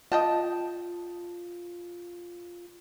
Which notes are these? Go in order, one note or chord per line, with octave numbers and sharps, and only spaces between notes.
F4 D#5 G5 A5